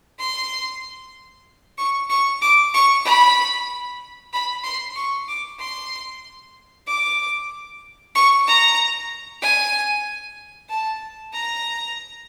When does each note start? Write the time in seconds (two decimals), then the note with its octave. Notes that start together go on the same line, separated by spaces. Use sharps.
0.19 C6
1.78 C#6
2.10 C#6
2.42 D6
2.74 C#6
3.05 B5
4.33 B5
4.64 C6
4.96 C#6
5.28 D6
5.60 C6
6.87 D6
8.15 C#6
8.47 A#5
9.42 G#5
10.69 A5
11.33 A#5